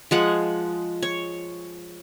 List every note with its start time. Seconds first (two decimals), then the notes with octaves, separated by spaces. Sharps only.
0.11 F3 G#3 F#5
1.02 C#5